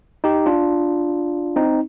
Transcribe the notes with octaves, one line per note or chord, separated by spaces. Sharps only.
D#4 G4
D4 F4
C4 D#4